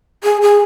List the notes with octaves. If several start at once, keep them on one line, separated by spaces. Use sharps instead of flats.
G#4
G#4